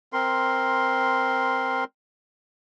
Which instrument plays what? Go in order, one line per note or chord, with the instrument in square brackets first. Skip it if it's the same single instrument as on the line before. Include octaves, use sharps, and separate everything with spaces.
[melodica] C4 A#4 C6